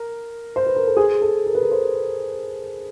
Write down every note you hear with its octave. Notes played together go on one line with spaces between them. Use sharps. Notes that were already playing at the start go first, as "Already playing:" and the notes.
Already playing: A#4
C5
B4
A#4
A4
G#4
A4
A#4
B4
A#4
C5